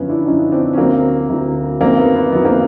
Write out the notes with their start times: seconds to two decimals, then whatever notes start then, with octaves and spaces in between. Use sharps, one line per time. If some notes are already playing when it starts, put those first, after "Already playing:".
Already playing: F#2 D3 F3 B3 C#4
0.09 D4 E4
0.26 F#2 D3 F3 C#4 D#4
0.52 C4 D4
0.73 C#4
0.78 D2 D3 F#3 A#3 C4
1.29 D2 D3 F#3
1.81 F#2 D#3 F#3 A#3 C4
1.98 B3
2.15 B3
2.32 F#2 D#3 F#3 B3
2.45 A#3 C4